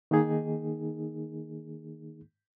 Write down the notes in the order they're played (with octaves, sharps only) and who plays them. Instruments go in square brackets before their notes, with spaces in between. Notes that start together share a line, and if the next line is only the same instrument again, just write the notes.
[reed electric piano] D#3 A#3 D#4 G#4